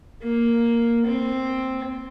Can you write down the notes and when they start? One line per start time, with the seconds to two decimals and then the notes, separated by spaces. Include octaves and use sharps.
0.22 A#3
1.06 C4